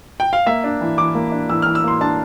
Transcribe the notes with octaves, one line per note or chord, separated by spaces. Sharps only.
G5
F5
A#3 E5
D4
E3
E3 D6
A#3
D4
E3 E6
E3 F6
E6
A#3 C6
D4 A5